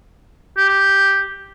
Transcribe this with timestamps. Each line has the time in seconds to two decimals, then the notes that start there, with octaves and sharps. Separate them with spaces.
0.58 G4